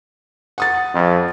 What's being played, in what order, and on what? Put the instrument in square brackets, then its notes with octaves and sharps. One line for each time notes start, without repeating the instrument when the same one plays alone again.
[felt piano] F#5 D#6 A6
[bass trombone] F2